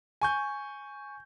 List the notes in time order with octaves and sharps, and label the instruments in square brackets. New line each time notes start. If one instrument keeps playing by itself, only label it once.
[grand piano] G#5 C#6 G6